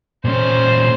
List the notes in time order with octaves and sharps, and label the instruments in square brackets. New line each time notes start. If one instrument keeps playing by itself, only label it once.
[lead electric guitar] A#2 C#4 [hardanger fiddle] C5